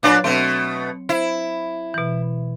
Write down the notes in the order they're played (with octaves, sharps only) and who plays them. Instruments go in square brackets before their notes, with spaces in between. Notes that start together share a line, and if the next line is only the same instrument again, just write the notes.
[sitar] A#2 D4 D5 [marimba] F#3 C#5 D6
[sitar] B2 A3 [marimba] C4
[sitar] E4 [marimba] C5
[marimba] B2 E3